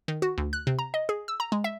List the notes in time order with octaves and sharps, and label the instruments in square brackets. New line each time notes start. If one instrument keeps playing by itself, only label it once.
[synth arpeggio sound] D#3
F#4
D2
F#6
C3
A#5
D#5
G#4
E6
A#5
G#3
E5